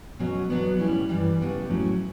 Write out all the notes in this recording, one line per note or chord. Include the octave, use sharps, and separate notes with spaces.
B2 F#3 C#4
B2 F#3 B3 D4
A2 G3 C#4 E4
G2 E3 G3
C#3 G3 B3 D4
A2 F#3 C#4 E4